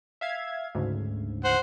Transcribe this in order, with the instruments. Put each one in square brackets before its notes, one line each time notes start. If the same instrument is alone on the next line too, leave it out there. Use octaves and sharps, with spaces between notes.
[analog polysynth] E5 F5 G#6
D2 G#2 C#3
[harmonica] C5 F#5